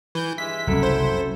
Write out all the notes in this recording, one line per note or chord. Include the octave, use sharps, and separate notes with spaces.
E3 G6
G2 G#3 E5 B6
F#1 C2 F#3 C#4 E4 A4
C5